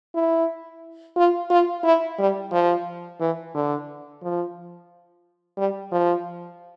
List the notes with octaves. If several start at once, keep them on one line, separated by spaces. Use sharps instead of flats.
E4
F4
F4
E4
G3
F3
E3
D3
F3
G3
F3